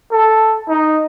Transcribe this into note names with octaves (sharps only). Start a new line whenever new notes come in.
A4
D#4